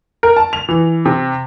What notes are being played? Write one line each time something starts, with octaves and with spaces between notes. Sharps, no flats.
A#4
A5
F7
E3
C3